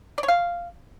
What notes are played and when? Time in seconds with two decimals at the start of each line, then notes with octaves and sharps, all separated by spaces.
0.18 D5
0.23 C#5
0.28 F5